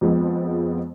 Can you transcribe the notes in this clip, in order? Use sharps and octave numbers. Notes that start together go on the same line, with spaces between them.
F2 F3 G#3 B3